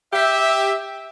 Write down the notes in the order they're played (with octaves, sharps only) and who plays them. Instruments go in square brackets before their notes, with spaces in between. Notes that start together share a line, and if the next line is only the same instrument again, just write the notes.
[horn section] G4 E5